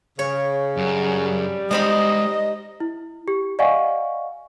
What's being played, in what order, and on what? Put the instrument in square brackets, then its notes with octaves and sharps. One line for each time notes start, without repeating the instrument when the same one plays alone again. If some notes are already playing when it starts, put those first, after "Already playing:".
[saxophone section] C#3 [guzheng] C#5
[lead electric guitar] F#2 [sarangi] G3
[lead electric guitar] G#3 G5 [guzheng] D#4 C5 B5 [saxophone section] D#5
[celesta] E4
G4
D5 D#5 F5 F#5 G#5 C#6